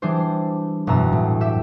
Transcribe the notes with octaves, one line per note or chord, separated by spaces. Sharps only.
E3 G3 D4 G#4 C5
E1 F#2 B2 A#5 E6
A2
G4 E5